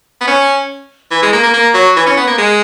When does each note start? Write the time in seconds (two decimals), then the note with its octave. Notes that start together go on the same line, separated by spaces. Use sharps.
0.21 B3
0.27 C#4
1.11 E3
1.23 G#3
1.33 A#3
1.43 A#3
1.53 A#3
1.74 F#3
1.96 E3
2.06 C#4
2.17 B3
2.27 A#3
2.38 G#3